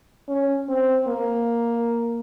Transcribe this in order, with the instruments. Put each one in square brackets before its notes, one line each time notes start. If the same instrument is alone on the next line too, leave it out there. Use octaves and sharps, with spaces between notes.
[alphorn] C#4
C4
A#3